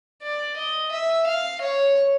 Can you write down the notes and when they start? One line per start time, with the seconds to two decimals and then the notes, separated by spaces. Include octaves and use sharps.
0.22 D5
0.57 D#5
0.92 E5
1.27 F5
1.61 C#5